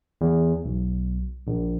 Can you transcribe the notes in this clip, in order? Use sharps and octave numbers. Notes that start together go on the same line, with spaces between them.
E2
B1
A#1